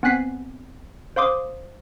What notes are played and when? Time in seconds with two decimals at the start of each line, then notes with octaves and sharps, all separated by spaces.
0.03 B3 C4 G#5 F#6 B6 C7
1.16 C5 F5 C6 D6 D#6